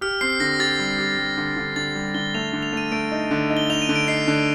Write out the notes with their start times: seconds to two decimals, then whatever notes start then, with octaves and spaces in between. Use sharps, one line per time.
0.01 G4 F6
0.21 C4 C7
0.40 D3 A#6
0.59 G4 A6
0.79 G3
0.98 G4
1.18 G3
1.37 D3
1.56 D3
1.76 D3 A6
1.95 G3
2.14 D3 G7
2.34 A3 F7
2.49 D3 F7
2.63 F7
2.73 A3 D#7
2.92 A3 D7
3.12 D#4
3.31 D3
3.50 D#4
3.57 G7
3.70 D#4 F7
3.82 D#7
3.89 D3
3.96 D7
4.08 D#4 C7
4.28 D3